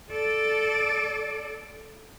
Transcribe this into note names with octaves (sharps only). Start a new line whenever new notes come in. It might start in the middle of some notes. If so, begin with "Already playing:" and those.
A4 D5